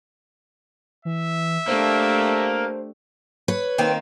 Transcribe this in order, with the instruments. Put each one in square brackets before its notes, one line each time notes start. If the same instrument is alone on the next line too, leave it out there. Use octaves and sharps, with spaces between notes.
[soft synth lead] E3 [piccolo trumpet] E5
[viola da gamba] A3 D4 G4 [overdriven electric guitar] A#3 [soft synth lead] C5
[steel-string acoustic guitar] B4 C#5
[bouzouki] D#3 A#3 C4